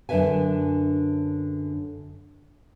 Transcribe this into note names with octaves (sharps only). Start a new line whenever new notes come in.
F#2 D3 D4 B4 E5 G#5